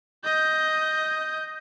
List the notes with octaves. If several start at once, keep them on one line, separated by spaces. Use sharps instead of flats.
D#5 G6